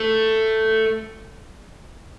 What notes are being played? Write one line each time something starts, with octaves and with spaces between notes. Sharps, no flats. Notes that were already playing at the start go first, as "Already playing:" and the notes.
Already playing: A3